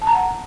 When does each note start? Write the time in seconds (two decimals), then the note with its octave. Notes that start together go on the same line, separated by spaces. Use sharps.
0.02 A5
0.07 A#5
0.13 F#5